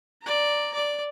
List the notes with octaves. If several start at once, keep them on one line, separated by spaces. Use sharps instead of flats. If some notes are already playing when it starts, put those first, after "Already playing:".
D5 A#5
D5